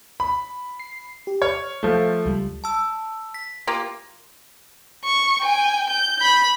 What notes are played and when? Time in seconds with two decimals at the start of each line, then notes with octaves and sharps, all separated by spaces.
0.20 B5
0.80 C7
1.27 G4
1.42 C#5 F6
1.83 F3 A3
2.26 C#2 G3
2.64 A5 E6
3.34 B6
3.67 A#3 F4 G4
5.05 C#6
5.42 G5 G#5
5.90 G6
6.21 B5